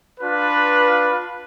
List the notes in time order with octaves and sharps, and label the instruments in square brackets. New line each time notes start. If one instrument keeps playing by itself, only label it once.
[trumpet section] D4 F4 B4